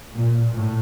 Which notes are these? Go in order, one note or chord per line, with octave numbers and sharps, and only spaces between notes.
A#2
A2